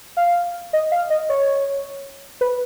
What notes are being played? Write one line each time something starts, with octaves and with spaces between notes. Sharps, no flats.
F5
D#5
F5
D#5
C#5
B4